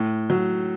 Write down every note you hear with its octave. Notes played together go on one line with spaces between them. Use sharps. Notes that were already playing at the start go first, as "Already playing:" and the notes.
Already playing: A2
F#3